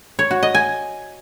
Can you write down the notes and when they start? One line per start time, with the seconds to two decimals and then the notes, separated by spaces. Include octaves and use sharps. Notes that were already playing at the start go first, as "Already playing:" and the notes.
0.19 C#5
0.31 F#4
0.43 D#5
0.55 G#5